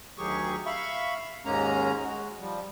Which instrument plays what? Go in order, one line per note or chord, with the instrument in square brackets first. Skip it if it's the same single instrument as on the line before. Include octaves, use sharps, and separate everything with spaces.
[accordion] D2 D#3 F#3 G4 G#4 C#6
E5 F5 B5 C#6
D#2 G#2 G#3 A#3 C#4 A#5
G#3 F#4
F3 G3